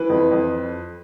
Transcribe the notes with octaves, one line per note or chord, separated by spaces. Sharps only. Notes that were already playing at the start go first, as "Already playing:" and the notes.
Already playing: E3 B4
F2
F2